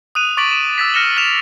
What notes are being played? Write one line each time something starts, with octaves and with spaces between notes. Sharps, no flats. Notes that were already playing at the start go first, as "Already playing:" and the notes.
D#6 F#6 D#7 F7
C#6 D6 A6 B6 D7 F#7
D7 E7
D#6 E6 A6 B6
F6 A#6 C#7 E7 G7
F6 A6 E7 F7